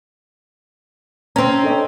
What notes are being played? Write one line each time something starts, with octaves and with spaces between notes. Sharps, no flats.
C4 C#4 A#5 C6
D4 A4 D#5